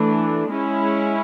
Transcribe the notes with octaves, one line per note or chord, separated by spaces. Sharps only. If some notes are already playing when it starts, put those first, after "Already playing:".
Already playing: E3 A3 D4
G#3 C#4 E4